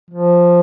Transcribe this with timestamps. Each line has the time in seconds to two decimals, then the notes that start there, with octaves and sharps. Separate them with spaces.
0.11 F3